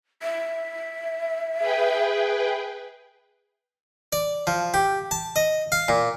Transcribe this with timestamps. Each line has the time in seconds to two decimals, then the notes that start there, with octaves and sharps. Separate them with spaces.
0.22 E5
1.59 G#4 B4 G5
4.13 D5
4.47 F3
4.74 G4
5.11 A5
5.36 D#5
5.72 F5
5.88 A#2